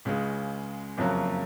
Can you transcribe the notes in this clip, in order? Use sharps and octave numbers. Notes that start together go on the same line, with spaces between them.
C#2 C#3 G#3
F#1 F2 C#3 F#3 A#3